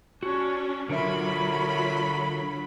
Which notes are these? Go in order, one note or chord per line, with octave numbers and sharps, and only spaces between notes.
C#4 D4 F#4
D3 F#3 F4 A#4 E5 B5